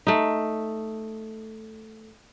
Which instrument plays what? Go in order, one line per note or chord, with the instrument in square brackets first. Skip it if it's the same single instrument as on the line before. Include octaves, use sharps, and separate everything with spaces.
[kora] A3 D#4